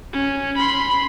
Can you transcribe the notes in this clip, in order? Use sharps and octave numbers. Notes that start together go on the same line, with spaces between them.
C#4
B5 C6